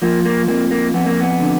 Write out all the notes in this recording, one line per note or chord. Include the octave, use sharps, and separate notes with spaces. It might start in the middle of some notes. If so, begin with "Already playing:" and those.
F3 A#3
A#3
F2 A#3
A#3
F2 B3
A#3
B3
D3